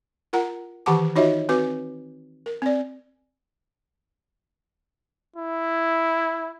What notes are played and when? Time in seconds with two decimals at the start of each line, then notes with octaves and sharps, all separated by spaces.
0.33 F4 A#4 F#5 A#5
0.86 D#3 E3 G4 F#5 A5 D6
1.16 D#4 F4 F#4 C#5 D#5 E5
1.49 C4 F#4 B4 D6
2.46 A#4
2.62 C4 D5
5.36 E4